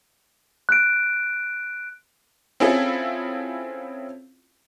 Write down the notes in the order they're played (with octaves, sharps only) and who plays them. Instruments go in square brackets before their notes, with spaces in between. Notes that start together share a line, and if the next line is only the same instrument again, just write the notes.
[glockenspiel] F#6 D7
[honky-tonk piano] C4 C#4 E4 F4 G#4 A4